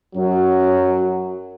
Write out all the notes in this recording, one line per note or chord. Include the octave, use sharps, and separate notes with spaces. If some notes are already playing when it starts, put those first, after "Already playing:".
F#2 F#3